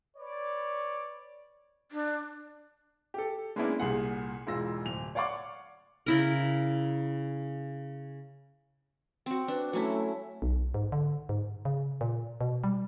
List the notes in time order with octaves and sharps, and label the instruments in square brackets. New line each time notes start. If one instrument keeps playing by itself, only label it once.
[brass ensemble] B4 C#5 D5
[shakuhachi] D4
[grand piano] G4 A4
G#3 A#3 B3 C#4 D4 E4
C2 A#2 G#4 F#5
E1 G#2 E3 F4 E6 A#6
D1 F7
C#5 D5 F5 F#5 C#6 D6
[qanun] C#3 E4 A#4
C4 F#4
[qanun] D4 [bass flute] B4
[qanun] F#3 C#4 E4 [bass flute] A3
[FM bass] B1
G#2
D3
G#2
C#3
A#2
B2
G3